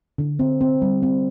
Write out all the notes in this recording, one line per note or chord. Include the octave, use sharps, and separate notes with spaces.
D3
C4
C4
G3
C4